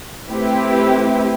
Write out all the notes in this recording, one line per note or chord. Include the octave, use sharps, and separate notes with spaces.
A3 C4 E4 G4 B4